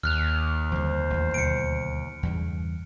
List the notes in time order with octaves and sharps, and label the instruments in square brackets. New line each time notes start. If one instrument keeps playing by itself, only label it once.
[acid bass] D#2 [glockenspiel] F6 F#6 F7
[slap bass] F2 D3 G3 [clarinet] C5
[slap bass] A1 E2
[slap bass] D2 B2 F#3 [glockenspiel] C#7 D7
[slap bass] E2 G2 C#3